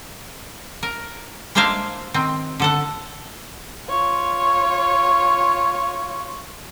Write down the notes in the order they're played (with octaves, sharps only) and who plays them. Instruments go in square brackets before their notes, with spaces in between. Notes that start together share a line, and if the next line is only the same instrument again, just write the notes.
[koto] A#4
G#3 A#3 D4 C5 E5 F5
D#3 C4
D3 A4 F#5
[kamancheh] F4 C#5